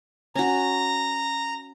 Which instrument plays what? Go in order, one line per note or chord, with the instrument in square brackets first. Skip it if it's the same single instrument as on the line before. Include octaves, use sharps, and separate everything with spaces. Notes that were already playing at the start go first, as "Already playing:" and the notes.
[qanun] C#4 F#4 [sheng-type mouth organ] A#5